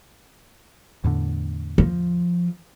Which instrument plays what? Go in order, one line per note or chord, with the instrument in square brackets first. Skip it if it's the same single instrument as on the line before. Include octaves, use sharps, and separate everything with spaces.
[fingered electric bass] E2 A2 D3
[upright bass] F3